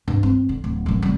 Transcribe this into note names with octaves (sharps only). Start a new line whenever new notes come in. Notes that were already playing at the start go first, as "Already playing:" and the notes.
G2
C4
D3
D1
A1 F#2
F1 G3